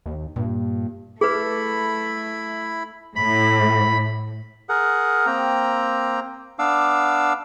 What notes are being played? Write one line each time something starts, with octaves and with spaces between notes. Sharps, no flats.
D#2
G2 A#2
A3 E4 G#4 B4 B5
A2 B5
G#4 A#4 F#5
A#3 C4 G5 A#5
B3 D4 F5 D6 E6